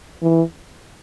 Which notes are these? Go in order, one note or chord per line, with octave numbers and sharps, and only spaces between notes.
E3